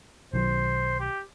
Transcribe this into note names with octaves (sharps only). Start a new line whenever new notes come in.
B1 D#3 F#3 C5
G4